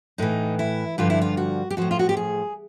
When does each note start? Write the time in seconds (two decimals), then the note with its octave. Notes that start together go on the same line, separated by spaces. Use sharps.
0.18 A2 E3 D#4
0.59 E4
0.98 G2 D3 F3 F4
1.10 E4
1.21 F4
1.37 F#4
1.70 G4
1.77 A2 F3 F#4
1.91 F4
1.99 F#4
2.09 G4
2.17 G#4